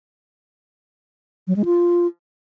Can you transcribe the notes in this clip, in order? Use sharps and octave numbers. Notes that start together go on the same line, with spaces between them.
F#3
G#3
F4